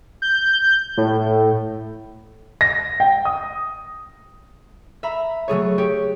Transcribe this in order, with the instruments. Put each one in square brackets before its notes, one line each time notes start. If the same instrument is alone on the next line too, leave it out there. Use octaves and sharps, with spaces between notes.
[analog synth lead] G6
A2
[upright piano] A#6
G5
D#6
[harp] E5 A#5 B5
F#3 A3 G#4 C#5
G4 C#5